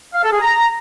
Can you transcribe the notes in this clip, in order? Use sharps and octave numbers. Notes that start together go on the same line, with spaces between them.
F5
A4
G#4
A#5